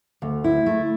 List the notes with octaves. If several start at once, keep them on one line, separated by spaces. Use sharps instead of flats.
D2
E4
A3